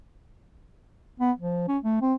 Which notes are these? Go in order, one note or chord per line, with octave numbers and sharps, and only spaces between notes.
B3
F3
C#4
A3
C4